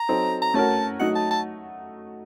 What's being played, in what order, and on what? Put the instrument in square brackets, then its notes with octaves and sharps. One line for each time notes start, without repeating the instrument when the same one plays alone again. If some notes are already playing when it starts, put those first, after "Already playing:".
Already playing: [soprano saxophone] A#5
[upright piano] F#3 C4 D#4 A4
[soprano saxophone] A#5
[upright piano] A3 C#4 F#4 A#4 [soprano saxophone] A5
[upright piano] F#3 A3 D#4 F#4 [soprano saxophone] F#5
[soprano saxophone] A5
A5